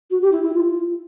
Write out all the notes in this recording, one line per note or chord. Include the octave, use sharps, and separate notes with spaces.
F#4
G4
E4
E4
F4